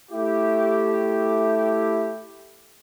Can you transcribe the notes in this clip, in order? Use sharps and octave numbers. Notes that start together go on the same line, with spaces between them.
A3 E4 G4